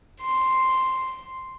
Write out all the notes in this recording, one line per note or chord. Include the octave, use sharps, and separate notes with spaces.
C6